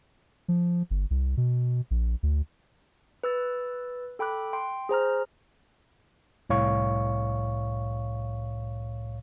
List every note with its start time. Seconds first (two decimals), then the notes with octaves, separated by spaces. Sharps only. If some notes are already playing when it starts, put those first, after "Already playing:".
0.48 F3
0.91 G1
1.11 C2
1.37 B2
1.91 A#1
2.23 D2
3.24 B4 E6 A6
4.19 A4 G5 B5 D6 F#6
4.53 G5 C6
4.89 G#4 C5 A#5 F6
6.50 C2 A2 C#5 F5 C#6